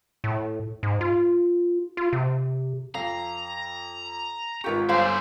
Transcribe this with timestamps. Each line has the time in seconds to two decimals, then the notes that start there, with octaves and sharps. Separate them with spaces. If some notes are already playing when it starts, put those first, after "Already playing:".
0.24 A2
0.83 G#2
1.01 F4
1.97 F4
2.13 C3
2.95 F2 F5 A#5
4.64 G#1 F4 G4 A#4 B4 C#6
4.89 G1 E4 C5 D5 F5 G#5